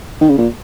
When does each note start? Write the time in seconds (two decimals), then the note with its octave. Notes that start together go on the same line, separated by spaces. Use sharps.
0.21 D#3
0.29 C#3
0.38 A#2